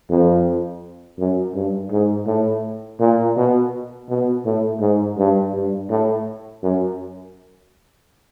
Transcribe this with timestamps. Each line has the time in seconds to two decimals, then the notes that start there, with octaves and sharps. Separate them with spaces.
0.10 F2
1.19 F#2
1.55 G2
1.91 G#2
2.27 A2
2.99 A#2
3.37 B2
4.09 B2
4.45 A2
4.80 G#2
5.18 G2
5.54 G2
5.90 A2
6.63 F#2